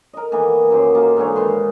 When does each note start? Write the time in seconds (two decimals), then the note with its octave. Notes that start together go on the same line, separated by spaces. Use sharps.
0.13 A#4 D#5
0.32 D#3 E3 A#3 B3
0.70 F#2 F#3 G4 C5
0.95 A#3 D#4 F4 A5
1.17 G#2 D3 E3 C#5
1.36 D#3 B4 C6